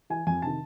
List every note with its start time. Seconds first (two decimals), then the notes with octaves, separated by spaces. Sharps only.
0.10 E3 G#5
0.27 F2 G#5
0.42 C3 D#3 A5